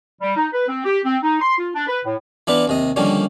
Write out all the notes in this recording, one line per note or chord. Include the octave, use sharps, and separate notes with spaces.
G3
D#4
B4
C4
G4
C4
D#4
C6
F4
D4
B4
A2
E3 B3 D4 F4 B4
D#2 C3 D#5
D3 D#3 F3 G3 A#3 C#4